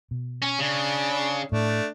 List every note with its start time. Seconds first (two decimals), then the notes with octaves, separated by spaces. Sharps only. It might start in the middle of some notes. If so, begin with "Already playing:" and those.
0.11 B2
0.42 C#4
0.59 C#3 D4
1.52 A2 A3 D4